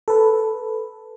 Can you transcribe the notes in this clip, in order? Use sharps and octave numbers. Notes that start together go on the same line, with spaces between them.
A4 B4